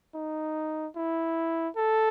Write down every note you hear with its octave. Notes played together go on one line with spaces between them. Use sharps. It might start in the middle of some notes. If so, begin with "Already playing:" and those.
D#4
E4
A4